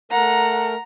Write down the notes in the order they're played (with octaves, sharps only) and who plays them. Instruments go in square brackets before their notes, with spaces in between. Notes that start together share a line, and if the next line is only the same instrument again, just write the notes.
[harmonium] A3 A#4 [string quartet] F#5 [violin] A#5